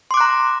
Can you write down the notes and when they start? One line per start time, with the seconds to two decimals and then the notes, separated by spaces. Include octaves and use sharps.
0.11 C6
0.14 D6
0.17 F#6
0.21 A#5